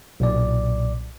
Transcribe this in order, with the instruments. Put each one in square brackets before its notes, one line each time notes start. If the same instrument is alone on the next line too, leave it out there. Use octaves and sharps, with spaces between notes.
[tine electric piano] B1 A#2 D5